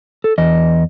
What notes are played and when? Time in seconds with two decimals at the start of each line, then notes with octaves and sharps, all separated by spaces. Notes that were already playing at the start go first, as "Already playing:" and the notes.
0.24 A4
0.38 E2 D#5